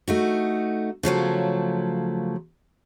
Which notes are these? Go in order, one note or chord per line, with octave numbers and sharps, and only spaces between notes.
A3 D#4 F#4
C#3 F3 F#3 A3